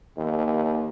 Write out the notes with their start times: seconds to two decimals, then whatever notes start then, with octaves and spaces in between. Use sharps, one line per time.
0.17 D#2